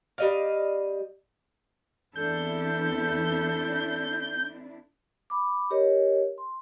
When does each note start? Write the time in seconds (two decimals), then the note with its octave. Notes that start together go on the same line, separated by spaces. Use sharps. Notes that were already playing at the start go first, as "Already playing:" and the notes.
0.18 G3 D#5 F5
2.16 E2 C4 D4 E4 A4 G6
5.30 B5 D6
5.71 G4 A#4 C#5 D#5
6.38 C6